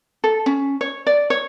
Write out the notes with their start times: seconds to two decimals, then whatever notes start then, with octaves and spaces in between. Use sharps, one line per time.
0.24 A4
0.46 C#4
0.81 C#5
1.07 D5
1.30 C#5